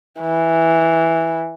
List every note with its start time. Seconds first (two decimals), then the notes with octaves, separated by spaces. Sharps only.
0.21 E3